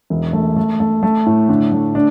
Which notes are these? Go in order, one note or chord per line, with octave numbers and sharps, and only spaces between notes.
E1
A3
A3
A3
A3
A2
D3
A3
D4